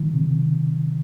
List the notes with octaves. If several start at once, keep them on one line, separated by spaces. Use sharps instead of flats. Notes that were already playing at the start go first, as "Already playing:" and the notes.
Already playing: D#3
C3
C#3